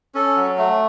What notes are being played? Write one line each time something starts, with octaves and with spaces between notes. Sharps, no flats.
C#4 A4
F#3
A3